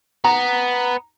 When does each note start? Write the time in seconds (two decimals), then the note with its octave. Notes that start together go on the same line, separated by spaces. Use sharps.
0.24 B3 A#5